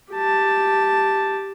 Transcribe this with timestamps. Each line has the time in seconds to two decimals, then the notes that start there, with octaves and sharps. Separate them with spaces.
0.12 G4 A5